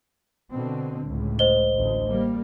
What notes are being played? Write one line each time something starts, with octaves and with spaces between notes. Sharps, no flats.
B2 D3 C4
C#2 A2
C5 D#5 G7
A1 D2
G3 A#3